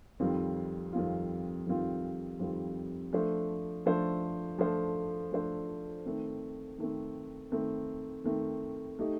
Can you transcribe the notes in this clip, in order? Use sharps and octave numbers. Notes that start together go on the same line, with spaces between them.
F2 D#3 G3 C4 F4
F2 D#3 G3 C4 F4
F2 D#3 G3 C4 F4
F2 D#3 G3 C4 F4
F3 A3 D4 A4 C5
F3 A3 D4 A4 C5
F3 A3 D4 A4 C5
F3 A3 D4 A4 C5
D#3 A3 C4
D#3 A3 C4
D#3 A3 C4
D#3 A3 C4
A3 D#4 G4